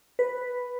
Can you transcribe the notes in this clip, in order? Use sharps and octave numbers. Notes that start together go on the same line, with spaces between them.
B4